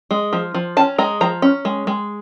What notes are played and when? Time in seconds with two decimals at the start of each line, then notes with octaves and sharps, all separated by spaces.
0.11 G#3
0.33 F3
0.54 F3
0.77 C#4 A5
0.98 G#3 A#5
1.21 F3 A#5
1.42 C#4
1.65 G#3
1.87 G#3